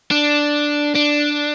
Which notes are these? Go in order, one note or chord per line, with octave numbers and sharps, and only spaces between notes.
D4
D4